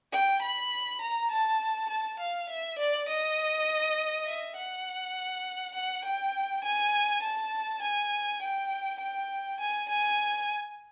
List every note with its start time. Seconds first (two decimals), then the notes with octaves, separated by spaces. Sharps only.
0.12 G5
0.42 B5
1.01 A#5
1.31 A5
1.90 A5
2.20 F5
2.49 E5
2.79 D5
3.08 D#5
4.27 E5
4.56 F#5
5.75 F#5
6.04 G5
6.64 G#5
7.22 A5
7.82 G#5
8.42 G5
9.00 G5
9.60 G#5
9.89 G#5